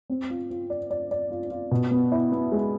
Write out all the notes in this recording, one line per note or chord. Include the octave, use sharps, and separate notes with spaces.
C4
F4
F4
D5
D5
D5
F4
F4
B2
B3
E4
B3
G#3